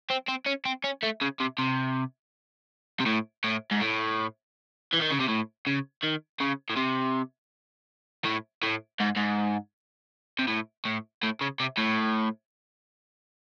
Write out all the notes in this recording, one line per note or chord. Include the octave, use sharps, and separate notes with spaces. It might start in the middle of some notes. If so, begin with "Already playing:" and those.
C4
C4
C#4
C4
C#4
A3
C#3
C3
C3
C3
A2
A2
G#2
A2
E3
D#3
C#3
C3
A2
C#3
D#3
C#3
A2
C3
A2
A2
G#2
G#2
C3
A2
A2
A2
C#3
C3
A2